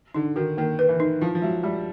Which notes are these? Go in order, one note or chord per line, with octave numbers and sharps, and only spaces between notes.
D3 D#4
D#3 F#4
D#3 A#3
B4
E3
D#4
F3 E4
F3
F#3 G#3
G3 G#3